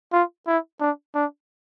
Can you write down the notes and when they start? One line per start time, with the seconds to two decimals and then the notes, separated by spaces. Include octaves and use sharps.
0.13 F4
0.47 E4
0.80 D4
1.15 D4